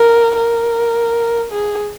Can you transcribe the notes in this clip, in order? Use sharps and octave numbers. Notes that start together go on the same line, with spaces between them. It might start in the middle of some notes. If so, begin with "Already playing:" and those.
Already playing: A#4
A#4
G#4